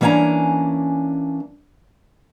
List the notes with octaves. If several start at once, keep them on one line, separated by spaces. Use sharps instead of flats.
E3 A#3 C#4 D4 G#5 A#5